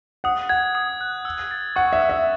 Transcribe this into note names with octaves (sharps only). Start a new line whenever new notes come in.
F#5 D#6
F#5 G#6
D#6
F#6
E6
A6
F#5 C#6
E5
E6
E5